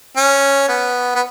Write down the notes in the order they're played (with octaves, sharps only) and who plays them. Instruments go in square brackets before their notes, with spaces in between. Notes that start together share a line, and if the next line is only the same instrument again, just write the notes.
[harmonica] C#4
B3
B3